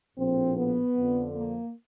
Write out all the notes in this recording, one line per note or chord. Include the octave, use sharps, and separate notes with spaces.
A#1 A2 F3 C4
B3
F2 D3 F3
A#3